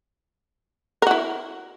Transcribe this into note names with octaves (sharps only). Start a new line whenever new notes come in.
E4 F#4 A#4